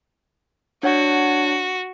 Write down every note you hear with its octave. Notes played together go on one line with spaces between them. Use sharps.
D4 F#4 C#5 F#5